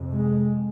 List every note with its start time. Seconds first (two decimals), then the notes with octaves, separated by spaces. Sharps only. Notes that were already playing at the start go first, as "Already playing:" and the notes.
Already playing: F2 C3
0.11 G#3